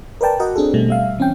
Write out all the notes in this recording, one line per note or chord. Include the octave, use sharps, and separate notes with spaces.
A#4 B4 D5 G5 A5
F#4 A#4 D#5 F#5
C4 D4 G#4 A4
B2 G3 A3
G3 E5 F5
E3 C4 C#4 G5